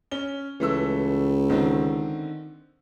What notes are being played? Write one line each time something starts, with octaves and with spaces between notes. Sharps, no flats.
C#4 G7
C#2 E3 A3 E6
D3 D#3 C4